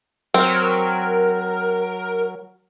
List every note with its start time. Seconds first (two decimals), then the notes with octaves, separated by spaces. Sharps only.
0.34 F#3 C4 A#4